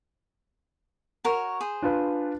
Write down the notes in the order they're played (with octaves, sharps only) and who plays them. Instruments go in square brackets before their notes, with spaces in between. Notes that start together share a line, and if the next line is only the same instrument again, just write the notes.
[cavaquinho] F#4 A#4 C#5
G#4 C5
[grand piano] D4 F4 B4